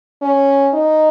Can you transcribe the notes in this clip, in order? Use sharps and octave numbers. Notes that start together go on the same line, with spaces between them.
C#4
D#4